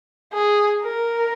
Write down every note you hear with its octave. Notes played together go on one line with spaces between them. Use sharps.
G#4
A#4